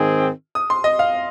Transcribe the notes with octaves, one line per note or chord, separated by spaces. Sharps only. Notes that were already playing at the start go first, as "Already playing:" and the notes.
Already playing: G#2 D#3 C4 G#4
D#6
C6
D#5
F5